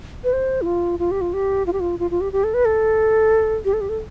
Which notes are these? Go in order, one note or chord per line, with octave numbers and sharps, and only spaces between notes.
B4
C5
E4
F4
F4
G4
F4
G4
F4
G4
F4
F4
F4
G4
G4
A4
B4
A4
G4
A4
G4
A4